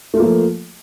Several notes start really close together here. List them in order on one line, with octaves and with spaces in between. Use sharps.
A3 F4 A#3 F3